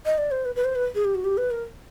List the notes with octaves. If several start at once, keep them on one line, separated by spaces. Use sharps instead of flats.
D#5
D5
C5
B4
B4
C5
B4
G#4
G4
F#4
G4
B4
A#4